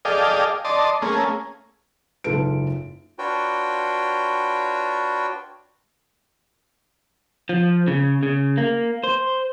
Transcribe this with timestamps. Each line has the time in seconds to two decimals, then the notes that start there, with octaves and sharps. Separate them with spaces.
0.05 G#4 A4 D5 D#5 F5 G5
0.65 D5 D#5 A5 C6
1.02 A3 A#3 C#4 G#4
2.24 F#1 G#2 F4 A4 B4 D7
3.19 D4 F4 F#4 B4 C#5 G5
7.49 F3
7.87 C#3
8.23 C#3
8.57 A#3
9.04 C5